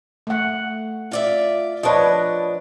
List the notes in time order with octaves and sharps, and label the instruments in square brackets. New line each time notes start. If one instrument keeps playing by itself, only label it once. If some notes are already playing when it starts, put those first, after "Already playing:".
[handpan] A3 F#5
[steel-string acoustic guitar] F4 D5 E5
[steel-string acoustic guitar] F3 D4 [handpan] B4 C#5 D#5